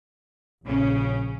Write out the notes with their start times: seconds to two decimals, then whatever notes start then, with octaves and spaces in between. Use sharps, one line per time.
0.65 A#1 C#3 C#4